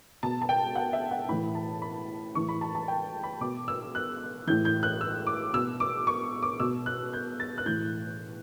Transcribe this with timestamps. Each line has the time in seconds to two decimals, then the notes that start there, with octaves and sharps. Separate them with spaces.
0.23 B2 A5
0.42 A5
0.49 G5
0.76 F#5
0.93 E5
1.11 F#5
1.29 A2 E3 B5
1.55 A5
1.82 B5
2.35 A2 E3 C#6
2.49 B5
2.61 A5
2.75 A5
2.88 G5
3.23 B5
3.41 B2 D6
3.68 E6
3.95 F#6
4.47 A2 E3 G6
4.65 G6
4.83 F#6
5.01 E6
5.27 D6
5.54 B2 E6
5.80 D6
6.07 C#6
6.42 D6
6.60 B2 E6
6.86 F#6
7.13 G6
7.40 A6
7.58 F#6
7.66 A2 E3 G6